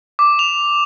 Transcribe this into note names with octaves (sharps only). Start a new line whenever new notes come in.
D6
F7